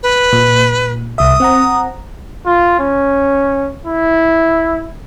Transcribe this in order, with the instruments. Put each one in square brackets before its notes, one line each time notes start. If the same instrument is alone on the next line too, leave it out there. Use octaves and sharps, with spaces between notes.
[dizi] B4
[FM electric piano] A#2
[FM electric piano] C2 E5 [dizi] D#6
[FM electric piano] C4 F#5 A#5
[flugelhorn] F4
C#4
E4